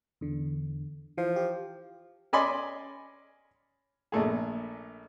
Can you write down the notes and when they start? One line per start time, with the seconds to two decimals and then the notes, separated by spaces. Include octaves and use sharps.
0.21 E2 D3
1.17 E3 F3
1.36 G4
2.33 C#4 D5 D#5 G#5 B5 C6
4.12 A#1 A#2 A3 G#4